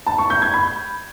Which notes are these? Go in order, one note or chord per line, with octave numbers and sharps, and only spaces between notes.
A5
C#6
G6
G#6
B5